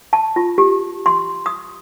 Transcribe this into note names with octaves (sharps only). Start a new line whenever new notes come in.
A5
F4
G4
C6
D#6